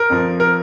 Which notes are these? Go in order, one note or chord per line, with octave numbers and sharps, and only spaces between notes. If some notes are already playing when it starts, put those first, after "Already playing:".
Already playing: A#4
F2 F3
A#4